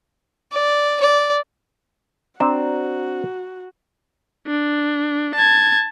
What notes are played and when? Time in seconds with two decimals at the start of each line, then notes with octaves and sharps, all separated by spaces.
0.52 D5
1.01 D5
2.40 C4 D4 F#4 A#5
4.47 D4
5.35 A5 G#6